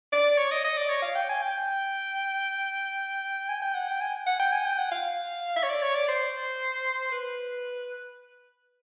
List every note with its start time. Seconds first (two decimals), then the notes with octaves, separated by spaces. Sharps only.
0.12 D5
0.37 C#5
0.51 D#5
0.64 D#5
0.77 D5
0.89 C#5
1.02 F5
1.15 G5
1.29 G#5
1.42 G5
3.49 G#5
3.62 G5
3.75 F#5
3.88 G5
4.01 G#5
4.26 F#5
4.39 G5
4.52 G#5
4.66 G5
4.78 F#5
4.91 F5
5.56 E5
5.63 C#5
5.70 D5
5.82 C#5
5.95 D5
6.08 C5
7.12 B4